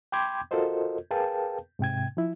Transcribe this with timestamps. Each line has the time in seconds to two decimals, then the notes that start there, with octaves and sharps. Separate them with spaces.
0.12 G5 B5 C6 D6 G6 G#6
0.51 F4 F#4 A4 A#4 C5 D#5
1.11 G#4 A#4 B4 F5 G5 A5
1.79 G#2 C3 G5 G#6
2.17 F3 E4